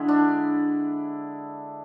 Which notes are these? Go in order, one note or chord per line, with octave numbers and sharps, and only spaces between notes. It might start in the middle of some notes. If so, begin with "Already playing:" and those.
Already playing: D3 G#3 E4
D4